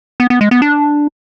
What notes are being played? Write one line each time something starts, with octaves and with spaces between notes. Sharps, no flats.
B3
B3
G#3
B3
D4